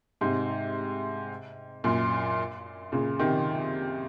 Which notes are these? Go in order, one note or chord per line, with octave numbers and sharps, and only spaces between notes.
G#2 C3
F#2 A#2
A#2 C#3
C3 D#3